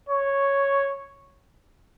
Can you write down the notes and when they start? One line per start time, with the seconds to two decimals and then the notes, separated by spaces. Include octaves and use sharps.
0.09 C#5